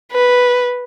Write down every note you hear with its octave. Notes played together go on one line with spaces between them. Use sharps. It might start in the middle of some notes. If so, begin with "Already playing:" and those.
B4